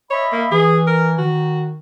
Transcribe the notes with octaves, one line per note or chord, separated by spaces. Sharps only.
C#5 D#5 E5 B5
A#3
E3 G#4
A#4
D#3 F#4